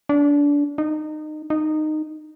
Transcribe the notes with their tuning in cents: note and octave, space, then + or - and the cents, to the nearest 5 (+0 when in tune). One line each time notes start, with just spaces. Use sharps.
D4 -25
D#4 -25
D#4 -15